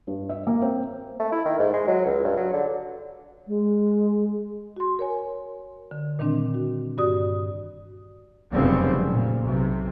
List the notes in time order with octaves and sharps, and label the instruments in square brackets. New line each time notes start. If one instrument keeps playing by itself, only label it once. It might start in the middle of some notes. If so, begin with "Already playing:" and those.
[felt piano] G2
E5
A#3
C4
[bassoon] A3
E4
D#3
G#2
G#3
F#3
C#2
G2
F#3
D3
[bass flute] G#3
[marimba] F#4 C6
A#4 C#5 G#5
D3
A#2 D#3 G3 C4 D4
F#4
G2 F#4 D5 D#6
[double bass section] F1 F#2 C#3 G3 B3 C4
A#2
B1 C3